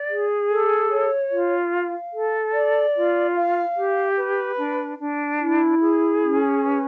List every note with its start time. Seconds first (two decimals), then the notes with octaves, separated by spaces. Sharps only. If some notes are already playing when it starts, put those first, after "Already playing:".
Already playing: D5
0.09 G#4
0.50 A4
0.91 C#5
1.31 F4
1.72 F5
2.13 A4
2.53 D5
2.95 F4
3.35 F5
3.76 G4
4.17 B4
4.57 D4
4.99 D4
5.40 E4
5.80 G#4
6.22 C#4
6.61 B4